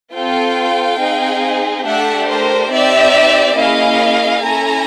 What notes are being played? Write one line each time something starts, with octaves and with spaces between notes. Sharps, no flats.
C4 F4 A4 F5 G5
C4 D#4 G#4
A3 D4 G4 E5 F#5
A#4 C5
C4 D#4 G4 D5 E5
A#3 C#4 E4 G#4 D#5 F5
C#4 E4 A4 G#5 A#5